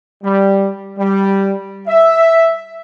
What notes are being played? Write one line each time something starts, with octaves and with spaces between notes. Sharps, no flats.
G3
G3
E5